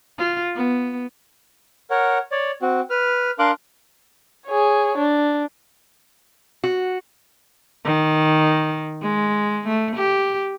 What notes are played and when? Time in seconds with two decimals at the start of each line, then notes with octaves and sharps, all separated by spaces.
0.18 F4
0.55 B3
1.90 A#4 C#5 F#5
2.32 C#5 D5
2.62 C4 F#4
2.90 B4 F6
3.39 D4 A#4 F5 C6 D6 F#6
4.46 G#4 C#5
4.97 D4
6.64 F#4
7.85 D#3
9.02 G#3
9.67 A3
9.96 G4